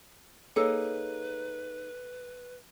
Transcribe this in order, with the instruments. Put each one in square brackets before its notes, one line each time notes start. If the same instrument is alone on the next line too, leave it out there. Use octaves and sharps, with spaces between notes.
[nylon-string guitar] A#3 D#4 G#4 [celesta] A4 [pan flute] B4 [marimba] C#5 E6